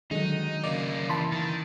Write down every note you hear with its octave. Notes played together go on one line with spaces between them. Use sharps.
D3 D#3 F#3 G#3 D#4
C#3 A#3 D5
E3 A5 B5 C6
D#3 A6